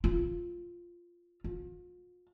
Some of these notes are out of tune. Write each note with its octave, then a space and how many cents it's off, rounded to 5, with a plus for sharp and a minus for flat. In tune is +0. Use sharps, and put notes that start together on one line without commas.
F4 -5
F4 +40